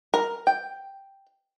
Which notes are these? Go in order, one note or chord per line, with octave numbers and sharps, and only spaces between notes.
A#4
G5